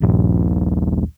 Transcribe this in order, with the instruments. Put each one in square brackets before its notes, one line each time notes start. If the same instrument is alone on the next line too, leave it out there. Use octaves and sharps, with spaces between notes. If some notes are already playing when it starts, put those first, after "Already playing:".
[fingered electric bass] D#1 A#1